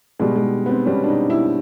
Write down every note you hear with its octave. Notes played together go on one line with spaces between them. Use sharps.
B2 G3 G#3
G#3
B3
C4
B2 G3 C#4
D4
D#4
E4